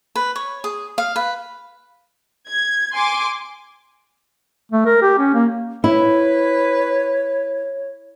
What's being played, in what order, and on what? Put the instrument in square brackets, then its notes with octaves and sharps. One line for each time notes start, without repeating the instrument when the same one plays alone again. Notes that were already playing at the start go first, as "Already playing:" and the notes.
[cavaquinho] B4
C#5
G#4
F5
B4
[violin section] G#6
G#5 C6 D6
[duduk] A3
A#4
G4
C#4
A#3
[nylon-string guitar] E4 [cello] B4 [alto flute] C#5